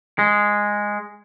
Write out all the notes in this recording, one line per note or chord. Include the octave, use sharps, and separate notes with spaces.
G#3